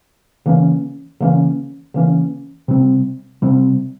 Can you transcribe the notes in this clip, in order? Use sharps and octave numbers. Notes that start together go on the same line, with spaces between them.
C#3 E3 A#3 C#4
C#3 E3 A#3 C#4
C#3 E3 A#3 C#4
C3 G3 C4
C3 G3 C4